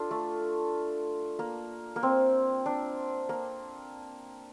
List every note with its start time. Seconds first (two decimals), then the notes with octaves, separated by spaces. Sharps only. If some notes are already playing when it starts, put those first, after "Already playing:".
Already playing: D4 F4 A4
0.11 A3
1.39 A#3
1.96 A#3
2.03 C4
2.66 D4
3.29 A#3